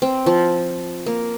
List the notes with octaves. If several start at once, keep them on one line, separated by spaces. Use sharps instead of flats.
C4
F3
A#3